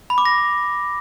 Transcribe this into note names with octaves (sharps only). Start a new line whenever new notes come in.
B5
D6
A#6